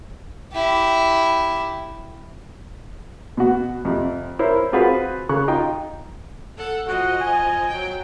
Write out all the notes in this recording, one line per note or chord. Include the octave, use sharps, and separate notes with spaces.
E4 G4
B2 F#4
F2 C3
E4 A#4 C5 C#5
C4 F4 F#4 G#4 B4 C5
C#3 C#6 F#6
D#4 F4 G5
A4 F#5
F3 F#4 D#5
G#5
F#3 G5